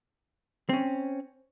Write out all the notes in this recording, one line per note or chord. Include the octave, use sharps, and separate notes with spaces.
C4 C#4